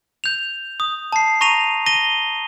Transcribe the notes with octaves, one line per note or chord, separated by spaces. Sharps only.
G6 F7
D#6
A5 C7
A#5 C#6 A#6 D#7 F7
A#6 D#7 G7